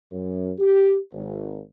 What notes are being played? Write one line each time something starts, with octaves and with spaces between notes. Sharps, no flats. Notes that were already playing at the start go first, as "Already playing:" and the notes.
F#2
G4
G#1